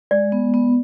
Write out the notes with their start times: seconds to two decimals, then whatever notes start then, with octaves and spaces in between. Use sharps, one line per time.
0.11 G#3 D5
0.32 B3
0.54 B3